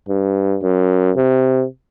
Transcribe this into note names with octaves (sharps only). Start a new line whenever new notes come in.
G2
F#2
C3